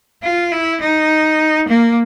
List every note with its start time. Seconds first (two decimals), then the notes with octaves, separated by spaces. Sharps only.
0.23 F4
0.52 E4
0.82 D#4
1.68 A#3